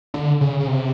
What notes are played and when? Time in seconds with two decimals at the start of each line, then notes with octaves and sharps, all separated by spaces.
0.14 D3
0.41 C#3
0.60 C#3
0.67 C3